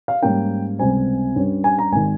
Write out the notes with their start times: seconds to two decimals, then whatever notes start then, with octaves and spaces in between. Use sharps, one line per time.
0.08 F5
0.22 G#2 G3 A#3 C#4 G5
0.79 C#2 C3 G3 C4 G#5
1.35 G2 G3 C#4
1.64 G#5
1.78 A#5
1.92 G#1 D#3 G#5